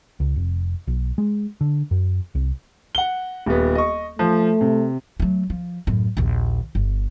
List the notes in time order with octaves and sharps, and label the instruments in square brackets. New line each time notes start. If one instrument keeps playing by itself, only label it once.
[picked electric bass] C#2
F1
B1
G#3
D3
F#2
C2
[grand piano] F#5 G7
D#1 B3
D#5 C#6
[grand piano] F3 [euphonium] A3
[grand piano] C3
[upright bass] F#3 A3
F3
F#2 A2
A#1 D#2
G1